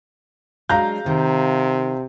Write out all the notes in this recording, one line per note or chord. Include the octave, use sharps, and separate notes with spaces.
F#3 G#3 D4 F5 A#5 G6
C3 D#3